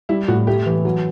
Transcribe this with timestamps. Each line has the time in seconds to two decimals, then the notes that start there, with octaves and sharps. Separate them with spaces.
0.09 G3 E4
0.28 A2 F#4
0.47 A3 G4
0.66 E3
0.85 F#3